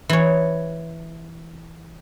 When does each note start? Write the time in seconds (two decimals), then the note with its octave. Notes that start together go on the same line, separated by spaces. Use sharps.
0.09 E3 C#5